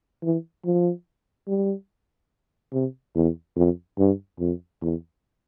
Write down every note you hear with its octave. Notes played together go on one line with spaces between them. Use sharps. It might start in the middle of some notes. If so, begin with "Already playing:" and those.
E3
F3
G3
C3
E2
F2
G2
F2
E2